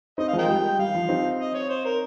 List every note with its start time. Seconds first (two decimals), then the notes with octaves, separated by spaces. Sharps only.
0.18 C4 D#4 D#5
0.28 F5
0.33 F3 G#3
0.38 A#4 D#5 G5
0.48 G3
0.79 G3 F5
0.94 F3
1.09 C4 D#4
1.40 D#5
1.54 C#5
1.69 C5
1.85 A#4